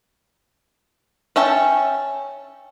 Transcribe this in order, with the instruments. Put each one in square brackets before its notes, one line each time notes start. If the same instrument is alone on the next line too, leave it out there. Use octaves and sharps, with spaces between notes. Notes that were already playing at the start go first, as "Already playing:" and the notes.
[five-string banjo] C#4 E5 G5 A5